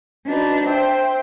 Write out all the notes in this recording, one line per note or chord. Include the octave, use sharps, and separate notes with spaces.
D4 D#4 F#4 B4
C5 E5 G5